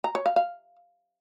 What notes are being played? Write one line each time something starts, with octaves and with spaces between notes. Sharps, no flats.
A#5
C#5
F5
F5